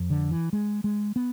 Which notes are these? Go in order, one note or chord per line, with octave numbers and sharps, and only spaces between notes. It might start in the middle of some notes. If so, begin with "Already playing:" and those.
Already playing: F2
D3
E3
G#3
G#3
B3